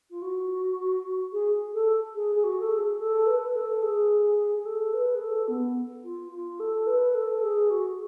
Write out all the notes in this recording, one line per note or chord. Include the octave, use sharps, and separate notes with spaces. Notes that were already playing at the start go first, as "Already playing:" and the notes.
F4
F#4
G#4
A4
G#4
G#4
F#4
A4
G#4
A4
B4
B4
A4
G#4
G#4
A4
B4
G#4
A4
B3
F4
F4
A4
B4
A4
G#4
F#4